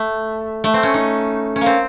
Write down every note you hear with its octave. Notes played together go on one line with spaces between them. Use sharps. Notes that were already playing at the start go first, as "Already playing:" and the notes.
Already playing: A3
A3
C4
C#4
D#4
C#4
A#3 C4